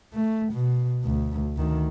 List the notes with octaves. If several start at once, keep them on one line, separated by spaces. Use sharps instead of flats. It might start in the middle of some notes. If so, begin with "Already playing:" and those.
A3
B2
D2
D2 D#3